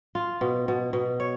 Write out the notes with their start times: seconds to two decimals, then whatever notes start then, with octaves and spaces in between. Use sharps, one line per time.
0.15 F4
0.41 B2
0.68 B2
0.93 B2
1.20 C#5